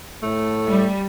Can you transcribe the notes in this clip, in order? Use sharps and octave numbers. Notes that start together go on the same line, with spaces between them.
A2 A3
G3